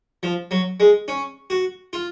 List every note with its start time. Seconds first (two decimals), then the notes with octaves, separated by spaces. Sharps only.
0.23 F3
0.51 F#3
0.80 G#3
1.08 C#4
1.50 F#4
1.93 F4